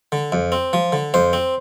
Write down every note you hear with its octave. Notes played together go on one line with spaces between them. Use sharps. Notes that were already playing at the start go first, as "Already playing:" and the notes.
D3
F2
C4
F3
D3
F2 C5
C4